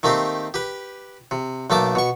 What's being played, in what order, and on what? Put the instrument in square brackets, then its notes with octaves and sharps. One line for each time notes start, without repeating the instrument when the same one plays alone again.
[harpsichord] D#3 A3 A#3 C4 G4
G4 B4
C3
B1 A3 A#3 A5 D6
B2 C#6